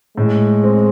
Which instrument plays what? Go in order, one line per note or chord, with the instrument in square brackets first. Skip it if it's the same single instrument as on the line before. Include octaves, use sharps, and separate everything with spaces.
[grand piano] A2 [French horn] G#3
[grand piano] C4